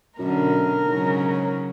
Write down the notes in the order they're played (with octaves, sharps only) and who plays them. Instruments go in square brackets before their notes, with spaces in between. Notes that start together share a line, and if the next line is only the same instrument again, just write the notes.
[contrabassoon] F#2 [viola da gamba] B2 D3 [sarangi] A#4
[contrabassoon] G#2 [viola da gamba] C#3 F#3